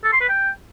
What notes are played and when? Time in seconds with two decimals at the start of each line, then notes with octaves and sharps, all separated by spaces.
0.04 A4
0.12 C6
0.21 B4
0.29 G5